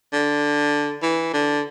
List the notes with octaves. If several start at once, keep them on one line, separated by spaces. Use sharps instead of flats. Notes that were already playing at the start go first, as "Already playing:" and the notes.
D3
E3
D3